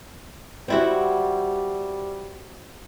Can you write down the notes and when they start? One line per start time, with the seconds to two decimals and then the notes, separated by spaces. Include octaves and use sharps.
0.68 G3 C4 E4 F#4